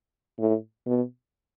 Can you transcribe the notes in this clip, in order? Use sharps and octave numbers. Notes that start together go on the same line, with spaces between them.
A2
B2